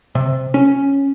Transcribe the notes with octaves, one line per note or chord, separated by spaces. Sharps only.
C3
C#4